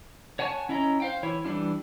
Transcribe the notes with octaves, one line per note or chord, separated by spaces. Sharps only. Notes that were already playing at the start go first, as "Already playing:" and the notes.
C#5 F#5 G#5 A5 C#6
C#4 E4 C#5 D#5 A#5
C5 F5 G5
E3 E4 C#5
E3 G3 D4 F4